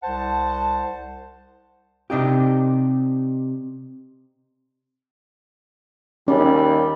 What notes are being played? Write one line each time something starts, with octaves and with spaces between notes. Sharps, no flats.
C2 C5 F#5 A5
C3 D4 D#4 G4
D#2 G3 C#4 D5